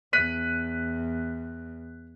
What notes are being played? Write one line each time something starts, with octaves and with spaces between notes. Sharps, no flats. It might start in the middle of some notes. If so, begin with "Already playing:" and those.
E2 F#6 B6 D#7